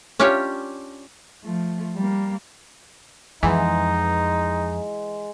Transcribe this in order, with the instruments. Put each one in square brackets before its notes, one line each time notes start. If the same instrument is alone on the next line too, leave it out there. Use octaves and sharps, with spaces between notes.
[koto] C#4 D4 F4 G4 C#5
[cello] F3 A3
G3 A#3
[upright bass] F2 [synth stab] E3 [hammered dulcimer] G#3 F#5 [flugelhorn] D#4